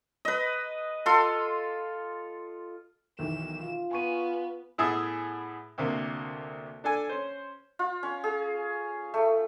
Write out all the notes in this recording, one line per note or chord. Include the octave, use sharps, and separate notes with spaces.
B4 D#5
F4 A4 C6
B1 D#3 E3 E7
F4
B3 G#5 C#6 D#7
A2 B3 G#4 E5 A5 D#6
D2 C3 A#3
D4 A4 G#5
C#4 C5
F4
C#4
G#4
A3